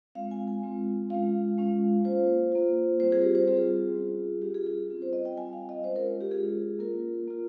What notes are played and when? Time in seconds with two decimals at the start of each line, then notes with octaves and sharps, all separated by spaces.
0.15 G#3 C4 F4 F5
0.31 G#5
0.48 G#5
0.63 G#3 C4 F4
1.10 G#3 C#4 F4 F5
1.58 G#3 C#4 F4
2.05 A#3 F4 C5
2.52 A#3 F4
3.00 G3 C4 F4 C5
3.12 G#4
3.23 G4
3.35 C5
3.47 G3 C4 F4 G#4
3.95 G3 C#4 F4
4.42 G3 C#4 F4 G4
4.54 G#4
4.67 G#4
4.90 G3 C4 F4
5.02 C5
5.13 D#5
5.25 G5
5.37 G3 C4 F4 G#5
5.53 F5
5.69 D#5
5.84 G#3 C#4 F4 C5
5.96 A#4
6.21 G4
6.31 G#3 C#4 F4 G#4
6.79 A#3 F4 A#4
7.27 A#3 F4